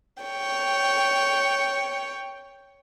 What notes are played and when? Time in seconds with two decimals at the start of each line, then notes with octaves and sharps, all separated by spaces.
0.23 C#5 G5